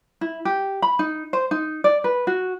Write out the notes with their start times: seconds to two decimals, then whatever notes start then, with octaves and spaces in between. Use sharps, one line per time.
0.21 E4
0.45 G4
0.82 B5
0.99 D#4
1.33 C5
1.51 D#4
1.84 D5
2.04 B4
2.27 F#4